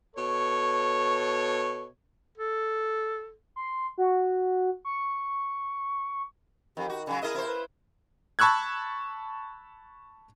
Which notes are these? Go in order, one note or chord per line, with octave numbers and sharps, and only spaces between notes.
B2 A4 C#5
A4
C6
F#4
C#6
F2 D#3 G4
F#4
C#3 F#3 G#5
E4 G#4 A#4 D#5
C3 E4 C5
B4
A5 B5 C#6 E6 F#6 G#6